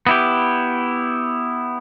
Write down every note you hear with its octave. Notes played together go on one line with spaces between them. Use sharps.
B3 E4 G4